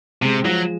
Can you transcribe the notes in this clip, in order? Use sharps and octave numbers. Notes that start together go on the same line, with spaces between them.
C3 G#3
F3 F#3